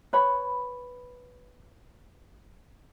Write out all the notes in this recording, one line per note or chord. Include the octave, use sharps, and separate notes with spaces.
B4 C#5 B5